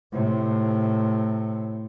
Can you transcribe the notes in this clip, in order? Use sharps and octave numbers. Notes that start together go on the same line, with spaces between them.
A2 C3